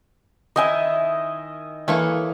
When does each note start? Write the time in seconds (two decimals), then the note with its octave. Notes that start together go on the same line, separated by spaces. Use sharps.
0.56 D#3 E4 D#5 E5 G#5
1.88 E3 A3 A#3 C#5